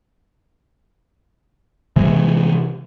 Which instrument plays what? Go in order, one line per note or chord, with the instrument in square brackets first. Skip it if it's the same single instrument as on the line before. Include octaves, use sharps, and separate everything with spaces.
[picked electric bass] C3 E3 G#3